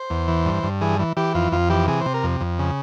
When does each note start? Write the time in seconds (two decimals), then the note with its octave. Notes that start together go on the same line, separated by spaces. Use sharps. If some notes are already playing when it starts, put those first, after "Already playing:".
Already playing: C5
0.10 E2
0.28 E3
0.45 G2
0.63 G2
0.81 E3 G#4
0.99 E3
1.17 E3 G4
1.35 F2 F4
1.52 F2 F4
1.70 E3 G4
1.88 C3 G#4
2.01 C3 C5
2.14 A#4
2.23 F2
2.40 F2
2.59 C#3